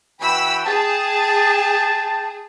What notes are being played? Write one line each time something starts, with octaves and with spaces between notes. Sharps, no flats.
E3 F#4 G5 B5 E6
G#4 G5 A5